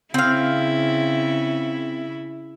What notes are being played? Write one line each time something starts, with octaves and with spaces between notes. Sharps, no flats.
C#3 C4 E4 F5